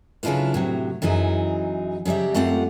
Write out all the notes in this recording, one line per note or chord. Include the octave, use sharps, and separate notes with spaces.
C#3 F#3 D4 E4 F4 B4
A2 C3 F#3
F#2 E3 F#3 D#4 G#4
C#3 F#3 G3 G4 E5
F#2 A3 C4 F4 G4 F#5